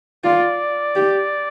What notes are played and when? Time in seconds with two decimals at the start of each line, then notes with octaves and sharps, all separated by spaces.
0.24 F4 D5
0.96 G4